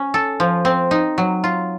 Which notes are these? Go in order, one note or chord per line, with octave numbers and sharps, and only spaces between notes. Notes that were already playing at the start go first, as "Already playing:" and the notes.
Already playing: C#4
A4
F3
C4
D#4
F#3
F4